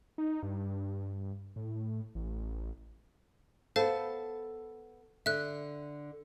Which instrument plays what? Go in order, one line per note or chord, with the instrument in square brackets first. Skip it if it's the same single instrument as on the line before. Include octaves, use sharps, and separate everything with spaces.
[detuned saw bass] D#4
G2
A2
A1
[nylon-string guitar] B3 A4 [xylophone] C5 F5 A5
[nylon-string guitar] D3 [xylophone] E5 F#6